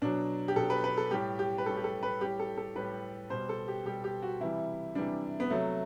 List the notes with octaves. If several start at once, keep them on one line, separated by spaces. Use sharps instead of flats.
B2 F#3 D4
G4
B2 F#3 A4
B4
B4
A4
A2 G3 G4
G4
B4
A2 G3 A4
G4
A4
B4
A2 G3 G4
A4
A4
A2 G3 B4
B2 G3 C5
A4
G4
B2 G3 G4
G4
F#4
C3 E3 G3 E4
C3 E3 G3 D4
B3
C3 F#3 A3